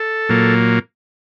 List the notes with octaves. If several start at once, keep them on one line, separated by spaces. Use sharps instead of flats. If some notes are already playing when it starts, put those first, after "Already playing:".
Already playing: A4
A#2 F#3 A#3